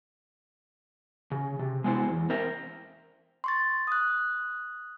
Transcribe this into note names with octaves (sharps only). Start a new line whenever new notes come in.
C#3
C3
G#3 B3 D4 E4 C5
E2
C4 A#4 C5 E5
C6 C#6 A6
D#6 F#6